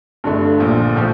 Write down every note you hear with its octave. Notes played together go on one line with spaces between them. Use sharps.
G2 D3 A3
A#1 A#2 F3
A2 F3